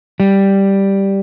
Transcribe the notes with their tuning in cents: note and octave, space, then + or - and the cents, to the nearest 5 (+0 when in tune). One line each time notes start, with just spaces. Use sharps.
G3 +0